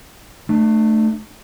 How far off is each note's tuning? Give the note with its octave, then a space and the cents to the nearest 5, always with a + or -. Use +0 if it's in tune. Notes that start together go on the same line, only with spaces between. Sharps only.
A3 +0 D4 +30